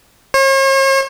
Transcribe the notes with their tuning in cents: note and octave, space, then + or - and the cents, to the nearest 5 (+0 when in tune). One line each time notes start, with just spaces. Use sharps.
C#5 -45